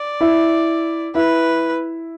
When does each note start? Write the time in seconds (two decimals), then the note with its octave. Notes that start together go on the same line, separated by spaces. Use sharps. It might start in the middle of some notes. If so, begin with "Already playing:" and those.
Already playing: D5
0.21 E4
1.15 E4 B4